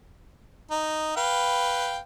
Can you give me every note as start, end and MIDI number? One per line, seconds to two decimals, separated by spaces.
0.71 1.13 63
1.17 1.98 71
1.17 1.98 77
1.17 1.98 79